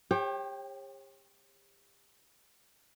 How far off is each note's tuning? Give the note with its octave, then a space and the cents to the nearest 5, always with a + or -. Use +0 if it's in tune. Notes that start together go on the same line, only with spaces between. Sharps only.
G4 +35 C#5 -40 G5 +0